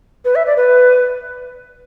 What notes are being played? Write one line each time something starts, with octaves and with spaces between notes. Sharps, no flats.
B4
E5
D5
B4